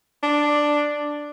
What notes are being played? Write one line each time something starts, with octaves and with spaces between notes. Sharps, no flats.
D4